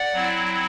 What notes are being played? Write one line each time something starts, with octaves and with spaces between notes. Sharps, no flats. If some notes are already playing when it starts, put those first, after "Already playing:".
Already playing: D5 F#5
F#3 C4 E4